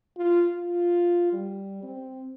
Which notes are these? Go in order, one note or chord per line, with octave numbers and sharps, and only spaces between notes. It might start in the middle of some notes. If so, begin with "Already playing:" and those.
F4
F4
G3
C4